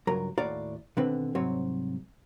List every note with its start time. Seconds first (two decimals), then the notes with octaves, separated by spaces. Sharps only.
0.07 C#2 G2 F#3 A#4 A#5
0.38 D#2 A2 F#4 D5 F5 A#5
0.97 B2 D3 D#3 C4 B4
1.35 C2 G#2 F#3 C4 C#5